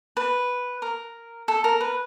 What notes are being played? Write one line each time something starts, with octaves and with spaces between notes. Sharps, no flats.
B4
A#4
A4
A#4
B4